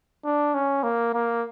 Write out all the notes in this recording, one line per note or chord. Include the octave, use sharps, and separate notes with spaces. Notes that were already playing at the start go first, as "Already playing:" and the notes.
D4
C#4
A#3
A#3